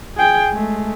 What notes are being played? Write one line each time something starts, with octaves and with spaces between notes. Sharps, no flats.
G#4 G5
G#3 A3